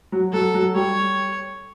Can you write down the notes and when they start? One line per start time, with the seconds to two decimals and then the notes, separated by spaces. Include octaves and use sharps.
0.12 F#3
0.33 F#3 A4
0.54 F#3
0.75 G3 C#5